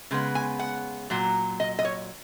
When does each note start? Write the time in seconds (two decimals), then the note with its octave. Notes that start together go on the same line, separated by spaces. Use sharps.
0.11 C#3 G#3 B3
0.35 G#5
0.59 F#5
1.10 A#2 F#3
1.60 D#5
1.79 D#5
1.85 C#5